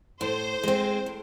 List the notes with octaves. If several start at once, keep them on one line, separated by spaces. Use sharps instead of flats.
A2 C5
G#3 C4
A2